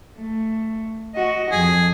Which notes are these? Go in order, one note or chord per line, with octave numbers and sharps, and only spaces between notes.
A3
F#4 D#5
F2 G#4